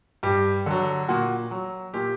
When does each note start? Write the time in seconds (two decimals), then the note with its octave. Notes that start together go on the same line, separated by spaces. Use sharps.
0.23 G2 G4
0.66 D3 F#3
1.09 A#2 F#4
1.51 F#3
1.94 A#2 G4